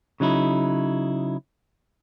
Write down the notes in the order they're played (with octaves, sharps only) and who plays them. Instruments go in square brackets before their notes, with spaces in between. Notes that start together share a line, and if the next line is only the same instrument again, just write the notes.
[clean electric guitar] C#3 F#3 D#4 E4